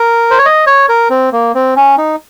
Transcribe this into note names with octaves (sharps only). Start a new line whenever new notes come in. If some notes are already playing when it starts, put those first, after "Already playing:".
Already playing: A#4
C5
C#5
D#5
C#5
A#4
C4
A#3
C4
C#4
D#4